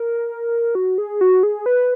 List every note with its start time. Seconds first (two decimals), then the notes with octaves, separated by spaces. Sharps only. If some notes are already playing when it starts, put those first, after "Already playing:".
Already playing: A#4
0.75 F#4
0.98 G#4
1.21 F#4
1.43 G#4
1.66 B4